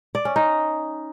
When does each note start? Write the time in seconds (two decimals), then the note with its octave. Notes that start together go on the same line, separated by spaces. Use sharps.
0.15 D5
0.25 C#4
0.36 D#4